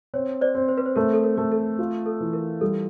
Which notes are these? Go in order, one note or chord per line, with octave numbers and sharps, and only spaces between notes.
C4 C#5
C5 D5
C4
C5
B4
C5
A3 A#4
A4
A#4
A3
A4
F4
A4
E3
A#4
G3 A4